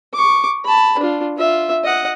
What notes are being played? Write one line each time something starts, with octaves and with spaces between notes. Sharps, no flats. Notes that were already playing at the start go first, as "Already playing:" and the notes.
C#6 D6
A5 B5
D4 F4
F4 E5
D#5 F#5